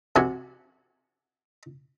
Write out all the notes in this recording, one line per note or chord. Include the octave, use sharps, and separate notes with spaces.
C3 F#4 G#5